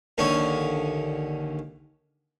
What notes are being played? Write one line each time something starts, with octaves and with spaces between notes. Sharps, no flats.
A#1 D#2 D3 C#4 C#6 D#6